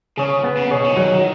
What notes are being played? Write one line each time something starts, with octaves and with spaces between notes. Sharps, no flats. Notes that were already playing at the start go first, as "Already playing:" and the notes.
C#3 G#4 C#5
B3
C#3
B2 G#4 C#5
D#3
F#3